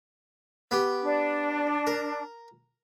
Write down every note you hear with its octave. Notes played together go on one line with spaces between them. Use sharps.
B3 G4
D4
A#4